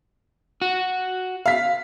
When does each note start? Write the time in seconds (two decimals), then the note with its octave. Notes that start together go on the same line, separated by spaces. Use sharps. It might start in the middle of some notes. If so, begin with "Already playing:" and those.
0.62 F#4
1.46 F5 B6